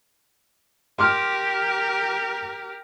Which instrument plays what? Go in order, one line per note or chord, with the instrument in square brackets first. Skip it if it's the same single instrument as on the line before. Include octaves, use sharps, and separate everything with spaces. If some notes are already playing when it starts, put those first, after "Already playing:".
[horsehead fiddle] G4 A#4 [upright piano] C6 D6 F6